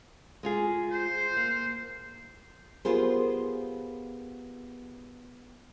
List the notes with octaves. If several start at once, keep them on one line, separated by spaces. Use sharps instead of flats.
G#3 F4 G#4
C5
A#3
B3 F4 G4 G#4 A#4 C5